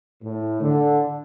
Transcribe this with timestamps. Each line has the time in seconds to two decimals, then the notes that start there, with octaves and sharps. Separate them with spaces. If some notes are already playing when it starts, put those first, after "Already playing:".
0.23 A2
0.61 D3